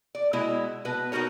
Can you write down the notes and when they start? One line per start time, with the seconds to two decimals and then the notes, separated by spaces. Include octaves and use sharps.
0.15 D5
0.33 B2 G#3 E4
0.85 B2 B4
1.12 B3 D#4 F#4 A#4 C#5